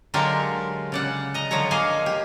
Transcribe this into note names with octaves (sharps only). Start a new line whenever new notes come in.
D3 F#3 G#3 F4 G4 A#4
C#3 D5 F#5
D#5 A#5
D3 F3 F#3 C#5 A#5
A#3 G#4 D#5 F5 G#5
G4